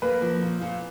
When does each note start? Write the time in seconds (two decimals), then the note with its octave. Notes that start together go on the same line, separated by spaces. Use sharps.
0.02 A#3 B4
0.22 F3
0.42 A#2
0.61 A#2